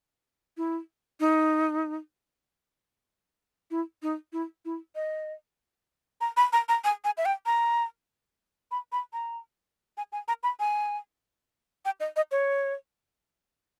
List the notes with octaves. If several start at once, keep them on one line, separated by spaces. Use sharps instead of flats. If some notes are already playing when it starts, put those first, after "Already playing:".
E4
D#4
E4
D#4
E4
E4
D#5
A#5
B5
A#5
A#5
G#5
G#5
E5
G5
A#5
B5
B5
A#5
G#5
G#5
A#5
B5
G#5
G5
D#5
D#5
C#5